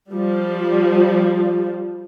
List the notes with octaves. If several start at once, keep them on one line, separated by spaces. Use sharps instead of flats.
F3 G3